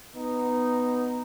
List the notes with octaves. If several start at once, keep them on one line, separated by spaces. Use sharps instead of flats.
B3 D#4